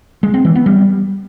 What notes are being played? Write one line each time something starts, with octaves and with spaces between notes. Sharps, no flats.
G#3
C4
E3
B3
G3